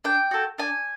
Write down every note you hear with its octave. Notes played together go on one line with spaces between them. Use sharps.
D4 G5
F#4 A4
D4 G#5